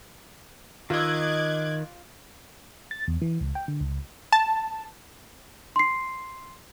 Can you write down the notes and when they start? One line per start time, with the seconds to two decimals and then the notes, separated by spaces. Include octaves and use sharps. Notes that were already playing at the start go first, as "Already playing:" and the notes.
0.90 D#3 F4 D#5 D6 E6 F#6 G#6
2.91 A6
3.08 E2
3.22 E3
3.40 C#2
3.55 G5
3.68 D3
3.81 C#2
4.32 A5
5.76 C6 C7